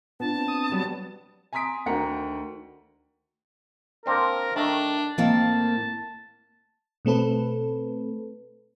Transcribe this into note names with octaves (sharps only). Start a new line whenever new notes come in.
B3 D4 F4 A5
C4
D#6
F#3 G3 B3
G#5 A#5 C6 D#6 B6 D7
D2 D#3 F#5 G5 A#5 C#7
A#3 C4 D4 A#4
D#3 A3 D4
A2 D#3 A#3 C4 A5
B2 A3 C4 A4 B4